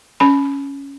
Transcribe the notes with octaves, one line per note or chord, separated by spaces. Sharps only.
C#4 B5